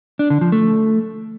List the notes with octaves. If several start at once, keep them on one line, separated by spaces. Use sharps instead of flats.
D4
D3
F3
A3